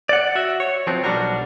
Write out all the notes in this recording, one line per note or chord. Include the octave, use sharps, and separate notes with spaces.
D5 F#5
F#4 E5
C#5
F3 F#3 B3 C4
B1 G3 D4 F#4 A#4